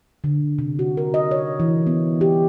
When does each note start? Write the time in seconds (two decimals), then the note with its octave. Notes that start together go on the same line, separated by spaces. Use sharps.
0.24 D3
0.59 C3
0.79 F#4
0.97 A#4
1.14 D#5
1.31 C#5
1.60 E3
1.87 B3
2.21 G4